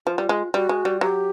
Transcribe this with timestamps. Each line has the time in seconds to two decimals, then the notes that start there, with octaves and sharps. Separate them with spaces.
0.06 F3 F4 F#4
0.18 G3
0.29 G#3
0.53 G3 F#4
0.69 G#3
0.85 G3
1.01 F#3 G4